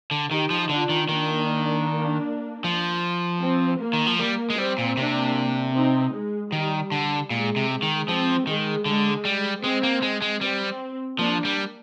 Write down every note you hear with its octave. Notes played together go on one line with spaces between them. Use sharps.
D3
D#3 D#4 G4
F3
D3 D4 F4
D#3
D#3 A#3 D4
F3
C4
A#3
D#3
F3
G3 A#3
G#3
G3 C4
A#2
C3 A#3 D4
C4 D#4
G#3
D#3 G3
D3
A#2 G#3
C3
G#3
D#3
F3 C4
D#3 G#3
D3 G#3
G3
G#3 C4
A#3
G#3
G#3
G3 C4
F3 A#3 D4
G3